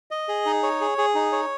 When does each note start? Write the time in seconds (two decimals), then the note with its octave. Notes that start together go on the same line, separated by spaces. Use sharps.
0.11 D#5
0.28 G#4
0.46 D#4
0.63 C#5
0.81 G#4
0.98 G#4
1.15 D#4
1.32 C#5